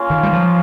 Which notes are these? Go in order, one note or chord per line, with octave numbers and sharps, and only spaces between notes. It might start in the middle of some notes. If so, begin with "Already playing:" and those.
Already playing: A#3 C#4 F4
D#3
G3
F3